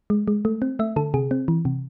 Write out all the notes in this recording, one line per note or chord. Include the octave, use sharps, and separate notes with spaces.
G#3
G#3
A3
C4
A3 E5
D3 A4
C3 G#4
C4
E3
C3